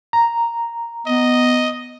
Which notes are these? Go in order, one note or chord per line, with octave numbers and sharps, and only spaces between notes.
A#5
B3 D#5